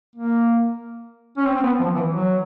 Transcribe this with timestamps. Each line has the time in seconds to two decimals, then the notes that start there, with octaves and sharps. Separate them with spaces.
0.16 A#3
1.37 C#4
1.46 C4
1.56 C4
1.63 B3
1.80 F3
1.95 E3
2.12 F#3